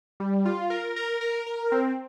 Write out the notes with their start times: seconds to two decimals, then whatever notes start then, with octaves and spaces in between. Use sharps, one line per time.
0.20 G3
0.45 F4
0.70 A#4
0.96 A#4
1.21 A#4
1.46 A#4
1.72 C4